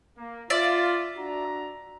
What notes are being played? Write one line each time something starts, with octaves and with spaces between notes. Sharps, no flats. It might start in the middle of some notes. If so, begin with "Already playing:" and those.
A#3
F4 D5 E5
D4 F#4 A#5